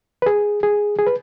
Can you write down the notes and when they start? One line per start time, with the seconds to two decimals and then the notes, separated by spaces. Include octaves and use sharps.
0.22 B4
0.26 G#4
0.63 G#4
0.99 G#4
1.07 B4